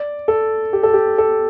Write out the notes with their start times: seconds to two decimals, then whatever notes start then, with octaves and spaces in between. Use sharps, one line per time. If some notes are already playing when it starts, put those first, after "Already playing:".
Already playing: D5
0.28 A4
0.73 G4
0.83 A4
0.94 G4
1.18 A4